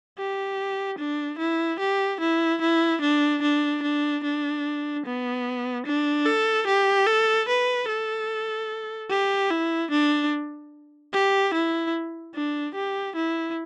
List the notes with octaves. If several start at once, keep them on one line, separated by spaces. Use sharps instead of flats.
G4
D4
E4
G4
E4
E4
D4
D4
D4
D4
B3
D4
A4
G4
A4
B4
A4
G4
E4
D4
G4
E4
D4
G4
E4